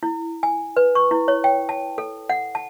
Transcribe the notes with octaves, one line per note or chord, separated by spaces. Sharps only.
E4
G#5
B4
C#6
E4
C#5
G5
A5
A4
F#5
A5